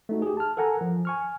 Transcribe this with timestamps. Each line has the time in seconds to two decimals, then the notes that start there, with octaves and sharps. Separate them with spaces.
0.09 A3 D#4 F#4
0.22 G4 G#4
0.37 A5 F6
0.57 A4 A#4 F#5 G#5 A#5
0.81 F3
1.05 G#5 C#6 F6